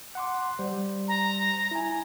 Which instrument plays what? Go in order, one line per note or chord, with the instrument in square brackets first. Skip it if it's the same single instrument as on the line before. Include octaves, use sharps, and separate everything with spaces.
[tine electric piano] F#5 C6 D6
G3 C5
[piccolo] A#5
[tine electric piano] E4 G#5